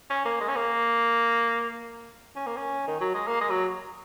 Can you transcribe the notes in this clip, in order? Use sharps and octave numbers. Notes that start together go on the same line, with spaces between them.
C#4
A#3
G#3
C#4
A#3
C#4
A#3
C#4
D#3
F#3
G#3
A#3
G#3
F#3